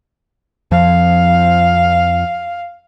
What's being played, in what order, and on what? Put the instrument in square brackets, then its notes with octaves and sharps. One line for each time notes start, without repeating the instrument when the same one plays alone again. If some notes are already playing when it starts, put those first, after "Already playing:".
[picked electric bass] F2 F3 [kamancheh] F5